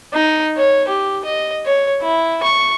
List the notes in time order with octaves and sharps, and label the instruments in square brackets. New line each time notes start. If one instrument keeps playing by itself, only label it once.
[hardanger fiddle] D#4
C#5
G4
D#5
C#5
E4
C#6